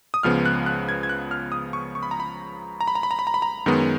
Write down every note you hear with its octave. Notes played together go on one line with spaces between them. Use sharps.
D#6
C#2 C#3 F3 B3 F6
F#6
F#6
G#6
G#6
F#6
F6
D#6
C#6
C#6
B5
A#5
B5
A#5
B5
A#5
B5
A#5
B5
A#5
B5
A#5
F#2 D#3 G#3 B3